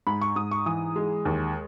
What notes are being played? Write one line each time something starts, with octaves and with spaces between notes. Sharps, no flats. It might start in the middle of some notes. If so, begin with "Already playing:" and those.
G#2 B5
C#6
G#2 D#6
C#6
E3 D#6
G#3
D#2